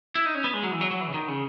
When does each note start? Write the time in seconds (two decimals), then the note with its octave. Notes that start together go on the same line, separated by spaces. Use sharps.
0.15 E4
0.26 D#4
0.35 C#4
0.44 B3
0.54 G#3
0.63 F#3
0.72 E3
0.81 F#3
0.91 F#3
1.01 E3
1.08 C#3
1.14 D#3
1.28 C#3